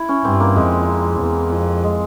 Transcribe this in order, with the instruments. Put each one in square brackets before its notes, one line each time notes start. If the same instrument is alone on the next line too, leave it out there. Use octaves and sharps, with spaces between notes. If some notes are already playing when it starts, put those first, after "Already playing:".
Already playing: [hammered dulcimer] E4
C#4
[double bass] G2 [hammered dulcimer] C4
[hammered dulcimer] A#3
[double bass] F2 [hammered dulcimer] G#3
[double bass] E2
F2
[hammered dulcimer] G#3